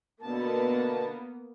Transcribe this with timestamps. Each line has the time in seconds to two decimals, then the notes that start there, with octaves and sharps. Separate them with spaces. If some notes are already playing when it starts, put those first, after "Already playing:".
0.22 B2 D3 A#3 B3 A5